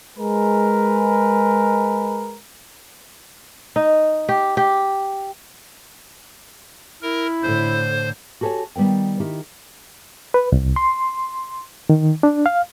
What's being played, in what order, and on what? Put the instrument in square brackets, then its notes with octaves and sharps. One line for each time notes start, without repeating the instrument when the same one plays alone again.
[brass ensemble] G#3 A#4 B4
[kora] D#4
G4
G4
[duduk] E4 [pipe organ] A#4
[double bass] A2 D3 [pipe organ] C5
[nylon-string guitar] F#4 G4 A4 C5 C#5 G#5
D#3 G3 B3 B4 G5
D#3 E4 G4
[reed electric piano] B4
C2
C6
D#3
D4
F5